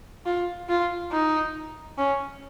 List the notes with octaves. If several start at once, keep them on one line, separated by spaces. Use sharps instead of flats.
F4
F4
D#4
C#4